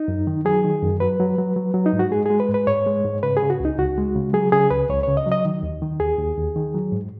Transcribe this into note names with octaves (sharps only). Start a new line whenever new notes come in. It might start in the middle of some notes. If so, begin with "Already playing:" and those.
Already playing: D#4
F#2
D#3
F#3 G#4
D#3
F#2
F#3 B4
F#3
F#3
F#3
F#3
D#4
G#2
F#4
G#3 G#4
G#3 G#4
B4
G#2
B4
G#2 C#5
G#3
G#2
C#3 B4
G#4
C#3
F#4
C#2 D#4
C#2 F#4
G#3
C#3
F#3 G#4
C#3 G#4
C#2 B4
C#2 C#5
C#3 C#5
D#5
F#3
D#5
D#3
D#2
D#3
D#2 G#4
D#2
D#2
D#3
F#3
G#2